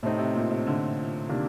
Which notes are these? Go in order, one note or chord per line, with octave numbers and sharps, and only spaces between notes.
A2 C3 A3 C4 D#4
C3
A#2
C3
D3
C3 D#3 A#3 D4